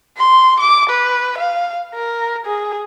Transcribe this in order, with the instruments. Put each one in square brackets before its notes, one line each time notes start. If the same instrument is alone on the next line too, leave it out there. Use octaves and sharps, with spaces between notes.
[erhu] C6
D6
B4
F5
A#4
G#4